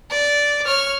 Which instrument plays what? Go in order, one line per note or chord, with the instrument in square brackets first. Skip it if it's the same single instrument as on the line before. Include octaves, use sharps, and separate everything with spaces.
[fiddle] D5
C#5 F6